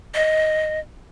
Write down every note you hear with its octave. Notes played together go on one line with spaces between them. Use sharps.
D#5